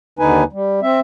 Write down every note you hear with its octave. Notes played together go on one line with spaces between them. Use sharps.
D#2 D3 D#4 B4 G#5
G3
C4 E5